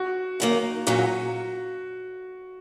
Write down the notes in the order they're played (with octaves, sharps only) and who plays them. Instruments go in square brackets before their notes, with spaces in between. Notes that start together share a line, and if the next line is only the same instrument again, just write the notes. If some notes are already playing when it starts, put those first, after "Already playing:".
Already playing: [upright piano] F#4
[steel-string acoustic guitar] F#2 D#3 A#3
[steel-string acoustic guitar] A#2 F#3 C#4 [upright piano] F#4